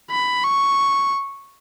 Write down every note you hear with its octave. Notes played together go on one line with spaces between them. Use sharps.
B5
C#6